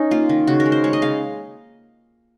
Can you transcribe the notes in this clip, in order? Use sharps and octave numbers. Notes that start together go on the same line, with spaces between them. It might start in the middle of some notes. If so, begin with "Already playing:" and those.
Already playing: C#4 D#4
A#3 F4
D#3
C#3 F#4
A#4
G#3
C5
G#3 C#5
D#5
C#3 F5